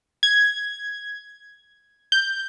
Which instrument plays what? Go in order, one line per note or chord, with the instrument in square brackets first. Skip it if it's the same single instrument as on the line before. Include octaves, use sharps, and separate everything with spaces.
[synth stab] G#6
G6